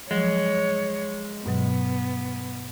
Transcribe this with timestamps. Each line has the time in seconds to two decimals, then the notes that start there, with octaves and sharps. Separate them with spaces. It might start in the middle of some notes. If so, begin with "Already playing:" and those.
0.11 F3 F#3 G#3 C#5
1.46 G2 B2 F#3 B3